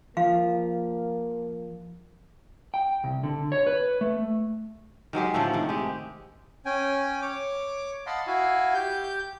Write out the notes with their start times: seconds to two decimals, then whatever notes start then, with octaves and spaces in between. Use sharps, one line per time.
0.17 F3 A#3 F5
2.74 G5
3.04 C2
3.24 D3
3.52 C#5
3.67 B4
4.01 A3
5.13 D#3 F#3 G#3 G4
5.34 A2 D3 F3 A3
5.53 C3 D#3
5.69 G#3 G4
6.66 C#4 G5 G#5
7.22 C#5 D6
8.06 D#5 F5 F#5 A5 B5 C6
8.27 E4 F#4 E5 F5 G#5
8.74 G4 G6